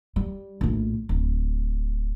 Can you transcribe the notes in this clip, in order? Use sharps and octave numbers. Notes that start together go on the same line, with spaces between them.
G3
A#1 A2
D1